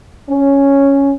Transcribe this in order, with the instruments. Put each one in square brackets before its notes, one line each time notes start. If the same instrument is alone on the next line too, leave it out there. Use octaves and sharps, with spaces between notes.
[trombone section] C#4